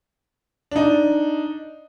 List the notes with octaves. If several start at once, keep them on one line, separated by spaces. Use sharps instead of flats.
D4 D#4